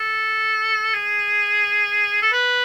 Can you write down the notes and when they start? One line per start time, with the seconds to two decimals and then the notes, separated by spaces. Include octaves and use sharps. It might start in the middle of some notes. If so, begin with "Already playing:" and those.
Already playing: A4
0.94 G#4
2.22 A4
2.32 B4